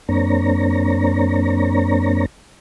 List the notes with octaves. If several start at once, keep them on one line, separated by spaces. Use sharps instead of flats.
F#2 A#3 C4 D4 C#5 A#5